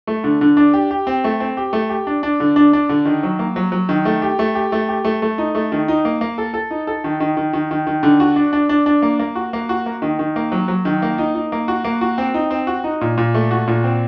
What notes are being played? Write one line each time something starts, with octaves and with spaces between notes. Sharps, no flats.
A3
D3
D3
D4
G4
G4
C4
A3
C4
G4
A3
G4
D4
D4
D3
D4
D4
D3
D#3
F#3
A#3
F#3
F#3
D#3
A3
G4
A3
G4
A3
G4
A3
A3
D#4
A3
D#3
D#4
A#3
A#3
A4
A4
D#4
A4
D#3
D#3
D#3
D#3
D#3
D#3
D3
F#4
D4
D4
D4
D4
A#3
A#3
F#4
A#3
F#4
A#3
D#3
D#3
A#3
F#3
F#3
D#3
A#3
D#4
D#4
A#3
F#4
A#3
F#4
C4
D#4
C4
F#4
D#4
A#2
A#2
A3
F#4
A#2
C4